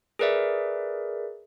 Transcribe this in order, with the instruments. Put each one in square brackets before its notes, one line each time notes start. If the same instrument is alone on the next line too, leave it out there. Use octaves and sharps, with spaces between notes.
[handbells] G#4 A#4 B4 D5 E5